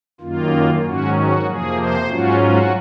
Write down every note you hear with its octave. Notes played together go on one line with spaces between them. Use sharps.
F#2 D#3 A#3 F4
G#2 D#3 F#3 C#4 F#4
F#4
F2 C3 F3 A#3 G#4
C5
G#2 F#3 C#4 F4 F#4
F#4